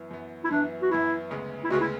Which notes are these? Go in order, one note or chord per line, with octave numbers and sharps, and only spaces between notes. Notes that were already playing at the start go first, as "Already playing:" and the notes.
Already playing: F#2 E3 B3
F#2 E3 B3
E4
F#2 E3 B3 D4
F#4
F#2 E3 B3 E4
D2 C#3 G#3 B3
E4
D2 C#3 G#3 B3 F#4
E4